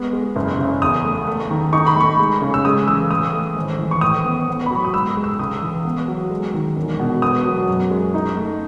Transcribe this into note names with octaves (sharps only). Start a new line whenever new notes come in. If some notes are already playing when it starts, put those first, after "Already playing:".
Already playing: G#3 B3
G#3
F#1
C#3
E2 D#6
A3
A3
D#3
D#4 C#6
B5
A3 C#6
G#3
C#3
E6
G#3 D#6
E3 E6
A2 D#6
A3
G#1
E3
C#6
A2 D#6
B3
B3
B5
F#3 C#6
D#6
G#2 E6
G#3
E6
C#2 D#6
E3
B3
F#3
G#3
D#3
E1
B2
B3 D#6
F#3
F#2
G#3
D#4
A3